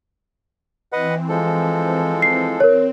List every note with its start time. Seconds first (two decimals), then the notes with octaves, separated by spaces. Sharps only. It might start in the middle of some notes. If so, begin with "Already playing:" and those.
0.93 E3 C4 B4 D#5 F#5
1.29 F3 G#3 A4
2.22 C7
2.60 C4 A#4 C#5